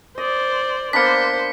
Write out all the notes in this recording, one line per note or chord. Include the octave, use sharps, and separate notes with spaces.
C5 D5 D#5
A#3 B3 D4 C5 B6 C#7